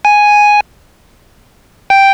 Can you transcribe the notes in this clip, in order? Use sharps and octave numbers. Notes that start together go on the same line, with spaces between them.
G#5
G5